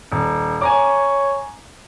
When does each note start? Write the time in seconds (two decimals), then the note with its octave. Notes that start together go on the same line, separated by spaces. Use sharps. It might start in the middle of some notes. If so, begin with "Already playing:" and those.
0.12 D#1
0.61 C#5 G#5 A#5 D6